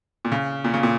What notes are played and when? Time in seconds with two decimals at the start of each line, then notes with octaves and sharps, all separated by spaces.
0.25 A#2
0.32 C#3
0.64 A#2
0.74 C#3
0.83 A#2